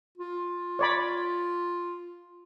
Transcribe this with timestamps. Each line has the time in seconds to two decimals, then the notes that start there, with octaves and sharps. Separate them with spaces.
0.18 F4
0.79 C#5 D5 B5